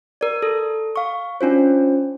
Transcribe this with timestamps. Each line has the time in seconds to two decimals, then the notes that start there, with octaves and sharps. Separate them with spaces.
0.21 A#4 D5
0.42 A4
0.96 F5 C#6
1.41 C#4 D4 F4 C5